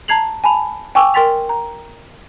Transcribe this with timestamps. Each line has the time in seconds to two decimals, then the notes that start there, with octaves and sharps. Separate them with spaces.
0.08 A5 A#5 G#6 C7 F7 F#7
0.44 G#5 A5 B5 F7
0.95 G5 G#5 C#6 D6 E6
1.14 A#4 G5 C6 A6 B6 F7
1.49 A#5